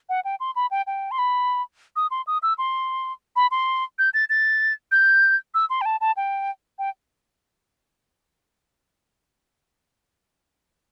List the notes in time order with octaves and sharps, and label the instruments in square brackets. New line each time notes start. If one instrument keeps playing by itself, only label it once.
[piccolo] F#5
G5
C6
B5
G5
G5
C6
B5
D#6
C6
D#6
E6
C6
B5
C6
G6
A6
A6
G6
E6
C6
G5
A5
A5
G5
G5